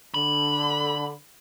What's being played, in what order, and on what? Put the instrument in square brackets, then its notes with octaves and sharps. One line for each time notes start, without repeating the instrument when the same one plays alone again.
[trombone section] D3 [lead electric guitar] B5